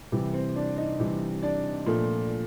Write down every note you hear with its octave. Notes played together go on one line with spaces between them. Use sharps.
C3 E3 G3 G4
C4 C5
D4 D5
D#4 D#5
C3 E3 G3
D4 D5
A#2 F3 A3